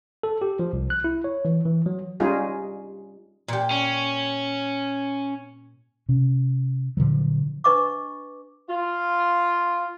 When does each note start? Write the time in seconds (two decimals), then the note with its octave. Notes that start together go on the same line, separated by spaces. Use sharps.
0.23 A4
0.42 G4
0.59 F3
0.73 C2
0.90 F#6
1.04 E4
1.24 C#5
1.45 E3
1.66 E3
1.86 F#3
2.20 G3 C#4 D#4 F4 G4 G#4
3.48 A#2 G4
3.71 C#4
6.09 C3 C#4
6.97 A#2 D3 F3 F#3
7.64 D4 B4 D#5 C#6 D6
8.69 F4